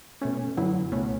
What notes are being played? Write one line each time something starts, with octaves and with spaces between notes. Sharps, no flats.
B2 A3 C#4
F#2 D3 F#3 B3 E4
C#2 B2 A3 C#4